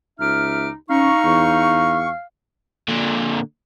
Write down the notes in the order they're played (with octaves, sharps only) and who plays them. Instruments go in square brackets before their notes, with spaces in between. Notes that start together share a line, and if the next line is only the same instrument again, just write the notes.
[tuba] C#2 [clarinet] D#4 [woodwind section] E5 D6 F6
[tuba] C#4 [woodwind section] D#4 C#6 [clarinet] F5
[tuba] E2
[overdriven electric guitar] A#2 D3